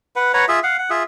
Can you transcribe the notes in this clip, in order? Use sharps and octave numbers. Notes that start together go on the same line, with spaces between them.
B4 F#5
B4 C#5 F#5 A#5
F4 G#4 E5
F5 F#5
F#5
F4 G#4 E5